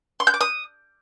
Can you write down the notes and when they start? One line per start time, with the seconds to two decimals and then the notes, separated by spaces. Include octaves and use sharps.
0.20 C6
0.27 G6
0.34 D6
0.41 D#6